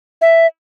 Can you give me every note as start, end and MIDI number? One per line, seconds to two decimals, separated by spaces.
0.21 0.47 76